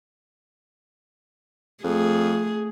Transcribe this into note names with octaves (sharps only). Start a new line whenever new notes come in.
F2 A3 G#4